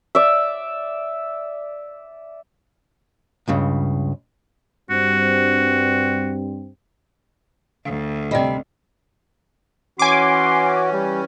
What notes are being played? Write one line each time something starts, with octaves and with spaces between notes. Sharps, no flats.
D5 E5
C#2 G2 C#3
G2 C4 F#4
D2 F5
C3 G3 C4 D5 D#5
E3 C#4 F#4 G#5 C6 D6
G3